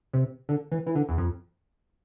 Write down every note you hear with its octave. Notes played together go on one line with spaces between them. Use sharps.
C3
D3
E3
E3
D3
E2
F2